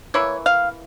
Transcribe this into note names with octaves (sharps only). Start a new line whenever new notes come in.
E3 A#3 E4 C#5
F5